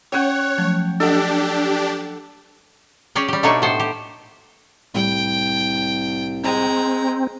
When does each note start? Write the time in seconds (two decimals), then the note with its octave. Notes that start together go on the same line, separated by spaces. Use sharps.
0.12 C#4 C#5 F#5 G5 G#6
0.58 F3 F#3 A3
1.00 D4 G4 A4 D#5 F#5 D#6
3.15 C#4 G4 G#4 D5 G5
3.28 G3 G4
3.43 B2 A3 A#3 D4 D#4 C#5
3.62 A2 B3 A4 C5
3.80 G4
4.95 C2 A2 G3 G5
6.44 G#3 C4 A#5